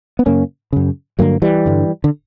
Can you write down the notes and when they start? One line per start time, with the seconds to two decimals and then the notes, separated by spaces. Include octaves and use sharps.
0.19 B3
0.26 F#2 C#3 A#3 C#4
0.73 F#2 C#3
1.19 G2 D3 F#3 A#3
1.42 E3 G3
1.66 G2 D3
2.04 D3